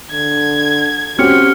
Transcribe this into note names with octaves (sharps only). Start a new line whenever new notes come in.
D3 G#6
C4 C#4 F#4 G4 F6 C#7